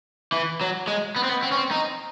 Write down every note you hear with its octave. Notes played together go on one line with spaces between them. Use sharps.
E3
F#3
G#3
B3
C4
B3
C4
C#4
C4
D#4